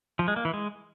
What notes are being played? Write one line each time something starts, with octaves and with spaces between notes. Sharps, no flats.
F3
G#3
A#3
E3
G#3